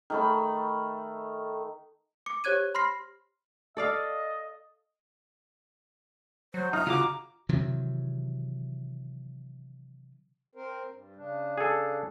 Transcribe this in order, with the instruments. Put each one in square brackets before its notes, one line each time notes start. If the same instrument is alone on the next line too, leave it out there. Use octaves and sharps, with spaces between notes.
[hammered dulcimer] D#3 A3 B5
[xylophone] D6 C#7
G4 C5 C#5 F#6 G#6 D#7
B5 C6 F6 A#6 C7
[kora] A4 D5 F5 [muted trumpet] D#5
[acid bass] F#3 [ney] C5
[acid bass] D#4 [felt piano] D#5 D#6 F6 [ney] A#5
[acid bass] C#3 [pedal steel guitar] F4 F#4 D6
[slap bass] C3 D#3 E3 F#3
[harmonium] C4 A#4 C5
G2
C#3 D4
[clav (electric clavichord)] G#4 A4